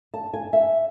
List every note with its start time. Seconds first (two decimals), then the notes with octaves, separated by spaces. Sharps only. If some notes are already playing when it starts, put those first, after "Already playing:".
0.14 A5
0.34 G#5
0.53 E5